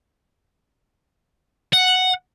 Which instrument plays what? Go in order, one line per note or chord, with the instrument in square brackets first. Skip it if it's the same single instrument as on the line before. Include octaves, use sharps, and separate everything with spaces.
[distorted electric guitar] F#5